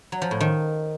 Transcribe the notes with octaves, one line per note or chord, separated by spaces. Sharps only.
F#3
F3
A2
D#3